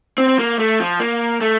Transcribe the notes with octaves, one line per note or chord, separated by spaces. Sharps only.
C4
C4
A#3
A3
F3
A#3
A3